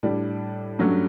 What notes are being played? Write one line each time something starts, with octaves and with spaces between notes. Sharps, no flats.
A2 G3 D4
G2 F#3 A3 C#4